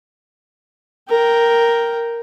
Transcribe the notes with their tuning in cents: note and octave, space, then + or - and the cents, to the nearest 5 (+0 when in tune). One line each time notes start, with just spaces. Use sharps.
A#4 +0 G5 -5